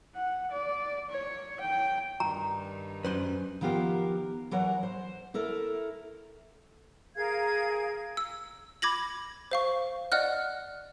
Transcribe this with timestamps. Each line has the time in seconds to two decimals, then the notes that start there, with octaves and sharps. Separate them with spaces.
0.15 F#5
0.51 D5
1.10 C#5
1.60 G5
2.20 G2 D#3 A#5
3.05 F#2 B4 C5 C6
3.61 D#3 F3 B3 F4 G4 A#4
4.51 E3 F#3 A#4 F#5
4.83 C5
5.34 E4 A4 A#4
7.16 G#4 A#4 F5 G#6
8.17 E6
8.82 B5 D6 G#6 A#6 F#7
9.51 C5 F5 C#6
10.12 D5 D#5 F#5 F6 F#6